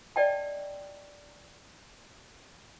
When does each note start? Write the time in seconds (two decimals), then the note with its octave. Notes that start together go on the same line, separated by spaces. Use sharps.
0.16 D5 D#5 G5 A5